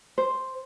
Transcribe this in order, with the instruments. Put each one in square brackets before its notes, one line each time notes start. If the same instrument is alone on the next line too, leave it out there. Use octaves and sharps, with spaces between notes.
[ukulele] C5